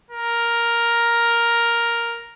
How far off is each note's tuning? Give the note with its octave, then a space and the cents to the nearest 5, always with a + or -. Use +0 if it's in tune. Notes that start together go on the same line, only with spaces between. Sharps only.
A#4 +5